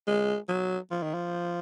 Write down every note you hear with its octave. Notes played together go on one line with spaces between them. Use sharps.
G#3
F#3
F3
D#3
F3